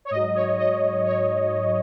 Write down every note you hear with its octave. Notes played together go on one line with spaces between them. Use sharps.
C#5
G#2 F#3 D#5
C#5
D#5
C#5